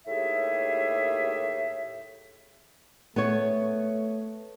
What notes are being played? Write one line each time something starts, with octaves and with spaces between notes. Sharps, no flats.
D#2 A2 G4 G#4 E5
A3 B3 C#5